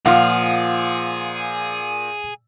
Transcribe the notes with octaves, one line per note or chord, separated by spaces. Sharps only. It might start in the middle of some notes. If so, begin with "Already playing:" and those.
A#2 F3 F4 G#4 F5 F#5